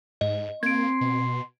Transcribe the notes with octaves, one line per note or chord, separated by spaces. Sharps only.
G#2 D#5
A#3 C4 C6 G#6 D7
B2